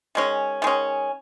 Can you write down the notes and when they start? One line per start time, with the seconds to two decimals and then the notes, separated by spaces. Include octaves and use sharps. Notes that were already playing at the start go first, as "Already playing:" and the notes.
0.15 D#3 G#3 C#4
0.62 D#3 G#3 C#4